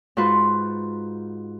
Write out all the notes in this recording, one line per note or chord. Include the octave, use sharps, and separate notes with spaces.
G#2 F4 F#4 B4 C6